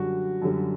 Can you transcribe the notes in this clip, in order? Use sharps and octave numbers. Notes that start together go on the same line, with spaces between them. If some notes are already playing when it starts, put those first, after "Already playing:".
Already playing: F#2 D3 G3 F#4
F#2 D3 G3